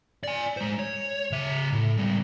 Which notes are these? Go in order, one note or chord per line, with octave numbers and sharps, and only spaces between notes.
D5 G#5
G#3 C5
C#5
C#3 E5
A2
C#2 G3